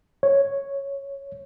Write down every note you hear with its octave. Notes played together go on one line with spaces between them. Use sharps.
C#5